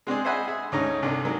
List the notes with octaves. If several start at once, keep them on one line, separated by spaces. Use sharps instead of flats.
G#3 C4 D4 G#4
C5 D#5 E5 F#5 G#5 B5
G#4 E5
D2 G#2 C#4 D#4 A#5
C2 G2 D3
D#3 F#3 G#4